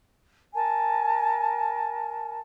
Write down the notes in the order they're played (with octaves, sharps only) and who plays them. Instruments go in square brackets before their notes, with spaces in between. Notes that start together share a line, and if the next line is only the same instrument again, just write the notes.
[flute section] A#4 G#5 A5